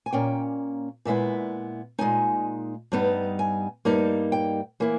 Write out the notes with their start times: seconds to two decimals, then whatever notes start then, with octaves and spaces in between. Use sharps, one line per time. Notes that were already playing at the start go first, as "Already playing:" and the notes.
0.06 G#5
0.13 A#2 A#3 C#4 G5
1.05 A#2 G#3 B3 E4 E5
1.98 A#2 G#3 D#4 G#5
2.92 G2 G3 B3 D#4
3.39 G#5
3.85 G2 G3 A#3 D#4
4.32 G5
4.80 E3 A#3 E4